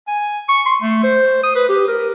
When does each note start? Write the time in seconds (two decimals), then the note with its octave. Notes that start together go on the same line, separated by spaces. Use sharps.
0.08 G#5
0.49 C#6
0.66 C6
0.81 A3
1.04 C5
1.43 D#6
1.55 B4
1.69 G4
1.88 A#4